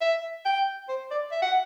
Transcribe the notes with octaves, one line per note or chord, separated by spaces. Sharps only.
E5
G5
C5
D5
E5
F#5